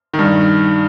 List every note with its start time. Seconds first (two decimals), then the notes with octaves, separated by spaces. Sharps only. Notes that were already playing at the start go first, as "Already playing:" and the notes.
0.14 D#3
0.19 G2